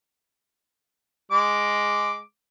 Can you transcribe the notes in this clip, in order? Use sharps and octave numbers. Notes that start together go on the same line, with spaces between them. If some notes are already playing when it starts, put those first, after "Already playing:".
G#3 D6